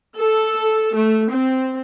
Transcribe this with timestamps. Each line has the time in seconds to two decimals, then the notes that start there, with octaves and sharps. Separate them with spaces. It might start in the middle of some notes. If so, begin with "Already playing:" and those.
0.18 A4
0.94 A3
1.31 C4